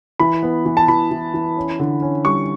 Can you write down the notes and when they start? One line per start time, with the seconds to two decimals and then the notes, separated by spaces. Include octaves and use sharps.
0.20 E3 B5
0.43 B3
0.66 E3
0.77 A5
0.88 E3 B5
1.11 E3
1.34 E3
1.57 C#4
1.79 D3
2.02 C#4
2.25 G3 C#6